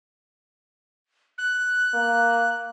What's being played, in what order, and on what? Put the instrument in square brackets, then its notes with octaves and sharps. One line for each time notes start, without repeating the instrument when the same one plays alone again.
[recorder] F#6
[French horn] A#3